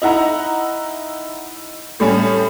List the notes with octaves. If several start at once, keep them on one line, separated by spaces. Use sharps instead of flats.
D#4 E4 F#5 A#5
A2 G3 C#4